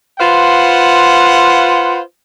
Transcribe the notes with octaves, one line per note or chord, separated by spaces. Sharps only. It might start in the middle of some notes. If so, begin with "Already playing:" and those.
F4 B4 C5 F5 F#5